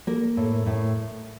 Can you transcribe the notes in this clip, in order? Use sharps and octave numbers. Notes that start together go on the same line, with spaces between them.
A#3 A#4
A2
A2